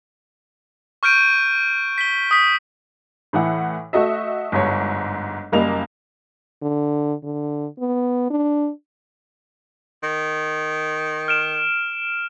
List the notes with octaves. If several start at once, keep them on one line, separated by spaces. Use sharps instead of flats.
C#6 F6 G6 D7 D#7
B6 G7
D#6 B6
A2 E3 E4 F#5
A3 F#4 D#5 E5
G1 G#2 C#5
F#1 G3 A#3 D#5 F7
D3
D3
B3
D4
D#3
F6 D7 E7